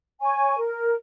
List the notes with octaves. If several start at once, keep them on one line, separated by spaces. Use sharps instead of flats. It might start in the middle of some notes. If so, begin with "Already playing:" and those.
C#5 G#5 C#6
A#4